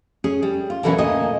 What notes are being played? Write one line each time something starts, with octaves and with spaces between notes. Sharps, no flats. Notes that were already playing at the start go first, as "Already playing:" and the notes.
C#4 G#4
G3
F4
B2 D3 E3 F#3 A#3 C#4
D2 A#2 D#5 G#5